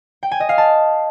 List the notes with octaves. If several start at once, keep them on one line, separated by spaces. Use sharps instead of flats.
G5
G#5
D#5
F5
A5